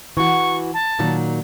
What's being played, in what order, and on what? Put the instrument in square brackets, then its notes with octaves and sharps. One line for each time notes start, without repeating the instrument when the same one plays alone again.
[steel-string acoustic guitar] E3 F#4 [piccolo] C#6
[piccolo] A5
[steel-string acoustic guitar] A#2 D#3 F#3